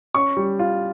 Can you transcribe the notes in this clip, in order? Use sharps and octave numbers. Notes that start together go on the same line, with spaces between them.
C#4 C#6
G3
F4